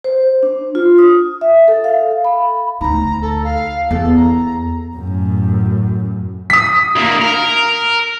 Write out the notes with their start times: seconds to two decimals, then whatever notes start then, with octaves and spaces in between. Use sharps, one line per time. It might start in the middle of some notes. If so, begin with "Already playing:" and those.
0.04 C5
0.43 D4
0.75 F4
0.98 D#6
1.41 E5
1.68 A4
1.84 F5
2.25 B5
2.81 D2 D#4 A#5
3.22 A4
3.44 F5
3.91 E2 A4
4.15 A#5
4.97 F#2 A2
6.50 D#6 B6
6.96 D2 A#3
7.22 A#4